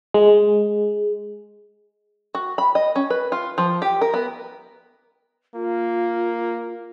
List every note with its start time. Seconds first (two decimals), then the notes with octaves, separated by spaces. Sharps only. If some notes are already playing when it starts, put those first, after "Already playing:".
0.14 G#3
2.35 F#4
2.58 B5
2.75 D#5
2.96 C#4
3.10 B4
3.32 F4
3.58 F3
3.82 G4
4.01 A#4
4.14 B3
5.55 A#3 F4